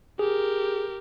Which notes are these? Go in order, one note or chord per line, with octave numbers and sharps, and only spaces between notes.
G4 G#4 A#4